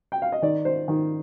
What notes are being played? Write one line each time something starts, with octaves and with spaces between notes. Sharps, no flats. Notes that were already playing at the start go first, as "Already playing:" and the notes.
G5
F5
D#5
D#3 D5
C5
D#3